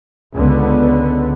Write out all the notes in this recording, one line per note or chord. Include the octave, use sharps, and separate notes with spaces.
C#2 D3 B3